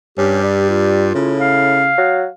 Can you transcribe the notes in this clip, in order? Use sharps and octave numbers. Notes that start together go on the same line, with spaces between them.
G2 C#4 G4
G3
F4
A2 C#3
F5
F#3